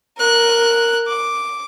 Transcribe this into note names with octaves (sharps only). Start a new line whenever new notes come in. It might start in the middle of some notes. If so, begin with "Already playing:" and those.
A#4 F#6
D6